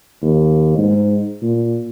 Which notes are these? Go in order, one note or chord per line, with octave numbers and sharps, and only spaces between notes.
D#2
G#2
A#2